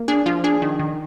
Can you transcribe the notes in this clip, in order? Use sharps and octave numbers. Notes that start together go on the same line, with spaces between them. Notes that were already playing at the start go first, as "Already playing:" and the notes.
Already playing: A#3
D4 G#4
F3 F4
D4 G#4
D#3
D#3